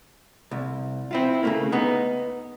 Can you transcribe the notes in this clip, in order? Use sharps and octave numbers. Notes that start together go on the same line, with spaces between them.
C2
C4 E4 F4
C#3 A3 A#3
B3 D#4